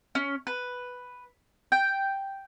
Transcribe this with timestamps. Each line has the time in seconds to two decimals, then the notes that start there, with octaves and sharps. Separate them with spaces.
0.15 C#4
0.47 B4
1.72 G5